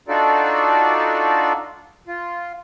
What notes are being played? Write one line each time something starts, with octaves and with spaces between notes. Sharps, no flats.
D4 D#4 F4 F#4 A4 D5
F4